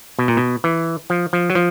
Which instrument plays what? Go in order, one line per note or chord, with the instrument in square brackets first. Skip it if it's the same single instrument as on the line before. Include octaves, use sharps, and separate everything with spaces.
[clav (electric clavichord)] B2
A#2
B2
E3
F3
F3
F#3
F3